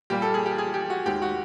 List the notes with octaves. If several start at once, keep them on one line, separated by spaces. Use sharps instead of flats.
A#2 G3 A#3 G4
A4
G#4
G4
G#4
G4
F#4
D#2 D#3 G#3 G4
F#4